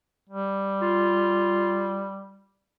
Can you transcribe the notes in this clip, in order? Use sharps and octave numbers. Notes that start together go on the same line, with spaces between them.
G3
F4